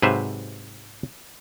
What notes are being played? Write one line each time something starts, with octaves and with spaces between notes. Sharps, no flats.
G#2 C3 F#3 B4 C5 E5